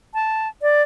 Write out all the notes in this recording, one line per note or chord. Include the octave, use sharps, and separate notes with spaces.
A5
D5